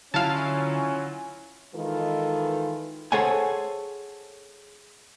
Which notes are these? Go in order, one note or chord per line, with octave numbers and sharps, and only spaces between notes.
D3 F#3 C#4 E4 F4 F5 A5
D#3 E3 G#3 F4 A4 B4
G#4 A4 C5 C#5 F#5 G#5